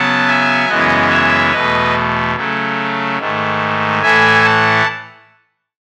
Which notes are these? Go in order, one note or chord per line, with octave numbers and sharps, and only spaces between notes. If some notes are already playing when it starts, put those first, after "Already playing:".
Already playing: C#3 F#3 B3 F#5 A5
E5 G#5
F#2 C#3 E3 G#3 B3 D#5 F#5
C#5 E5
E2 B2 A3 B4 D#5
C#3 F#3 A3
G#2 D#3 A3
A2 E3 A3 E5 G#5
F#5 A5